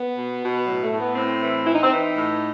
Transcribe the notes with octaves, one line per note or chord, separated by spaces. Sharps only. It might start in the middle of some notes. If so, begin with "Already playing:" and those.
Already playing: B3
B2
B2
A2 F#3
A3
A2
B3
A2 C4
E3
E3 E4
D#4
C4
E3 D#4
A2